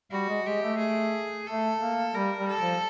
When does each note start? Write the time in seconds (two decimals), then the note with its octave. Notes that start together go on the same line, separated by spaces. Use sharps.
0.11 G3 F#4
0.29 G#3
0.46 G#3 G4
0.63 A3
0.79 G#4
1.47 A3 A4
1.81 A#3
2.15 G3 A#4
2.38 G3
2.49 A4
2.60 F3